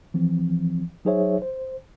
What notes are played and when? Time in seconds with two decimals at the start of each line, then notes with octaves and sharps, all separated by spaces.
0.14 E3 F3 C4
1.05 F#3 D#4 G#4 C5 C#5 E5
1.42 C5